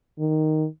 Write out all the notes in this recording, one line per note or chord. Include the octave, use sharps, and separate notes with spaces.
D#3